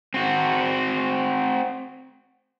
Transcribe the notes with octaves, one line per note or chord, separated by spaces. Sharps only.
C4 F#4